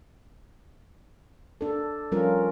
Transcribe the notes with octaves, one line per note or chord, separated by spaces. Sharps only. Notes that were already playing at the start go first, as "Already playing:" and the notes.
D4 A4
F3 G3 C#4 F4 A#4